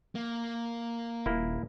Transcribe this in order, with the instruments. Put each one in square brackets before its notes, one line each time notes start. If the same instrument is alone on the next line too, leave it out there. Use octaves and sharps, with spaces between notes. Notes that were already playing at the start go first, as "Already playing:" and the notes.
[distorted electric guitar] A#3
[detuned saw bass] D#1 [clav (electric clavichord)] A#3 E4